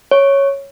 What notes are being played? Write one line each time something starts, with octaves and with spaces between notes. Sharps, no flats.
C#5